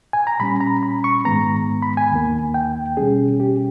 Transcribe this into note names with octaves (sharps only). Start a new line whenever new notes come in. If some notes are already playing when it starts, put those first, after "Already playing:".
G#5
A#5
A#2 G3 C#4 B5
A#5
B5
C#6
G#2 D#3 G#3 B3 A#5
B5
G#5
D#2 D#3 A#3
G5
B2 G3 C#4 G#4
G4